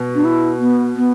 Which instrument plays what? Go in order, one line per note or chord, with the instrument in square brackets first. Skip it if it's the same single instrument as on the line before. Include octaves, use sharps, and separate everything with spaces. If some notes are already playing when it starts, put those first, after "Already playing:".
Already playing: [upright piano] B2
[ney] D4
E4
B3
B3